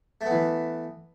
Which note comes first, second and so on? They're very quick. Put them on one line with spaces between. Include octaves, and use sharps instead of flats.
A3 B3 E3